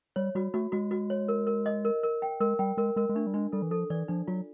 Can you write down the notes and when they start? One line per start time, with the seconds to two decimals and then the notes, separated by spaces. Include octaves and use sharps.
0.16 G3 C#5
0.35 G3 F#4
0.54 A3 F#4
0.72 G#3 F#4
0.91 F#4
1.10 C#5
1.28 A#4
1.47 A#4
1.66 D#5
1.85 A#4
2.03 A#4
2.22 G5
2.40 G#3 A#4
2.59 G3 G5
2.77 G#3 A#4
2.96 G#3 A#4
3.09 G#3
3.15 A3 D4
3.27 G3
3.34 G#3 D4
3.52 G3 A4
3.62 E3
3.71 F3 A4
3.90 E3 D5
4.08 F3 D4
4.28 F#3 F4